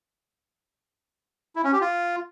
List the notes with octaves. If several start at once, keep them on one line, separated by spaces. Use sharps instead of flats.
E4
C#4
G4
F4